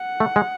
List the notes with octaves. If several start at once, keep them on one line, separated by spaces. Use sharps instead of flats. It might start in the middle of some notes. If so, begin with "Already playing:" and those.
Already playing: F#5
A3
G#3